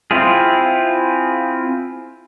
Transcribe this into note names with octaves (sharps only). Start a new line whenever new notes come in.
C4 E4 F4 G#4